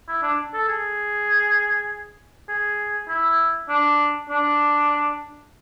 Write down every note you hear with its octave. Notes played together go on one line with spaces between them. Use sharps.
E4
D4
A4
G#4
G#4
E4
D4
D4